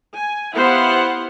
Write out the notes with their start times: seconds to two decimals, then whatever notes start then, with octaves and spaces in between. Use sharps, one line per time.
0.15 G#5
0.55 B3 E4 G4 C5 F5 F#5